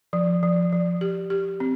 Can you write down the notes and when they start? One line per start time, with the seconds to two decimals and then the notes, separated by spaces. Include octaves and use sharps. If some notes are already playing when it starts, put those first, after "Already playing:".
0.13 F3
0.43 F3
0.72 F3
1.01 G4
1.30 G4
1.60 C4